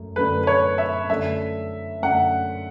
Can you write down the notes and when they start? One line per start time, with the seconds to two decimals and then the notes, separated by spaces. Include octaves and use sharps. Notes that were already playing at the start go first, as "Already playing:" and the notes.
Already playing: F#2 A3
0.16 F#2 D3 A3 B4
0.44 B4
0.47 C#5
0.78 E5
1.09 F#2 D3 A3 E5
2.02 F#2 D3 A3 F#5